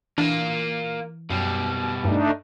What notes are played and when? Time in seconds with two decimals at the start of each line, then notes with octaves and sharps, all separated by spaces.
0.18 E3 A#3 D4 F4
1.30 F#2 B2 G3
2.05 G2 A3 D4 D#4